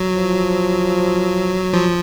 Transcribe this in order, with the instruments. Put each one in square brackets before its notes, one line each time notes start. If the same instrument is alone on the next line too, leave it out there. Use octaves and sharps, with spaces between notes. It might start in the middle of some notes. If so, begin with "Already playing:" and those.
Already playing: [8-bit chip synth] F#3
[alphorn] F3
[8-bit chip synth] F3